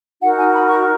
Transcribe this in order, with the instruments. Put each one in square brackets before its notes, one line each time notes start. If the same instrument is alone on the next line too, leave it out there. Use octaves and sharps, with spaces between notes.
[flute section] D#4 F#4 A#4 F#5
G#5
B5
C#6